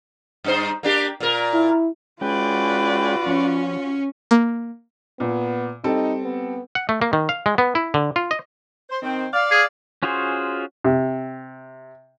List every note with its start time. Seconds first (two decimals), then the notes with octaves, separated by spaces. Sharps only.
0.44 G2 D#4 C5
0.83 A#3 D4 G4
1.20 A#2 A#4
1.54 E4
2.21 G#3 C#4 F4 F#4 B4 D5 G5
3.26 F3 C#4
4.31 A#3
5.20 A#2 B3
5.84 G3 C4 D#4 A4
6.23 B3
6.75 F#5
6.89 A3
7.02 A#3
7.13 D#3
7.29 F5
7.46 G#3
7.58 B3
7.75 E4
7.94 D3
8.16 F4
8.31 D#5
8.90 C5
9.02 D#3 C4
9.33 D5 F5
9.51 G#4
10.03 C#4 F4 F#4 G#4 C5
10.84 C3